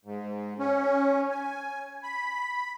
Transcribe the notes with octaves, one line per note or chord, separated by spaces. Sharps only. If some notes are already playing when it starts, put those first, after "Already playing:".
G#2
C#4
G#5
B5